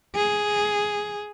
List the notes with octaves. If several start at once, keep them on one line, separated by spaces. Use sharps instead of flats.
G#4